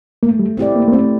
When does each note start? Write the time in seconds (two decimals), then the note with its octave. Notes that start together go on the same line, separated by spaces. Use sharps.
0.23 A3 A#3
0.39 G3
0.57 A3 C4 E4 G4 D5
0.76 A#3
0.88 A#3
0.92 A3 C4